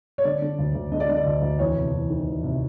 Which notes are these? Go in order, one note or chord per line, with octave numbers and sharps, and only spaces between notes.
C#5
D3 D5
D3
D2
D2
D3 D#5
D5
D3 D#5
D5
D2
D2
E2 C#5
C3
E2
D#3
E2
C3